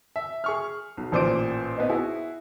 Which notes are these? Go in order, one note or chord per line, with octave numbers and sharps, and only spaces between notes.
E5
G#4 C#6 F6
B1
A1 A#2 C5 D5 D6 D7
B3 C4 D#4
E4 F#4 G#4